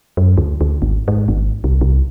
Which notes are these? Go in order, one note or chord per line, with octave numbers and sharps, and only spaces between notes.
F#2
D2
D2
G#1
G#2
G#1
C2
C2